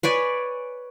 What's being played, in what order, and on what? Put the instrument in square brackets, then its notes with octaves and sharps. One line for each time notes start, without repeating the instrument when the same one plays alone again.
[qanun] B4 C#5 D5 G#5